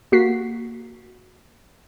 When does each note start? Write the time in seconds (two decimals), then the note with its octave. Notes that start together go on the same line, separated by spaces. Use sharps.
0.12 A#3 F#4 B6 C7